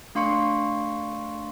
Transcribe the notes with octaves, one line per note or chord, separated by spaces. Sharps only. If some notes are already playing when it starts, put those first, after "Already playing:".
A3 D4 F5 C6 C#6 C#7